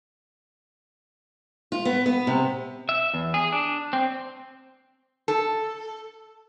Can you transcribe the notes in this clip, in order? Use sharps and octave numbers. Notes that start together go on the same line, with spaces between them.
F4
B3
B3
C3
E5
E2
G#4
D4
C4
A4